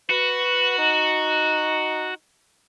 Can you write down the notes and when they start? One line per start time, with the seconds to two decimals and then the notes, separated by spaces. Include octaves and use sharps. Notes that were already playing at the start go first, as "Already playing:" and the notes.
0.10 F#4 B4
0.78 D#4